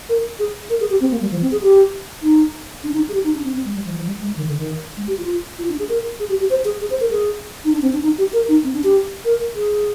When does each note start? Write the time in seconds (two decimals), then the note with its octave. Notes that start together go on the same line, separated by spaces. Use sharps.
0.09 A#4
0.39 G#4
0.70 A#4
0.80 G#4
0.90 G4
1.00 C4
1.11 A#3
1.21 G3
1.31 F3
1.42 C4
1.52 G#4
1.62 G4
2.22 D#4
2.84 D4
2.94 D#4
3.09 G#4
3.14 G4
3.24 D#4
3.34 D4
3.44 C4
3.54 C4
3.65 G#3
3.75 G3
3.85 F3
3.96 F3
4.06 G3
4.21 G#3
4.36 D#3
4.47 D3
4.57 D#3
4.97 G#3
5.08 G4
5.18 F4
5.59 F4
5.69 D4
5.79 G#4
5.89 A#4
6.20 G#4
6.30 G4
6.40 G4
6.50 C5
6.65 G#4
6.81 G#4
6.90 C5
7.00 A#4
7.11 G#4
7.65 D#4
7.72 D4
7.82 C4
7.92 D4
8.03 D#4
8.18 G4
8.33 A#4
8.49 D#4
8.64 C4
8.74 D4
8.84 G4
9.25 A#4
9.55 G#4